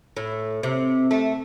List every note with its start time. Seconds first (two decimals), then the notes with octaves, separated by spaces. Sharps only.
0.17 A2
0.63 C3
1.11 A3